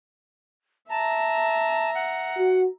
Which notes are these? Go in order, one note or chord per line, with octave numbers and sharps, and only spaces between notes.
E5 A5 A#5
F#5
F#4